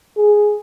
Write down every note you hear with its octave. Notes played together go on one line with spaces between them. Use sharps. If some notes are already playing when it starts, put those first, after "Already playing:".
G#4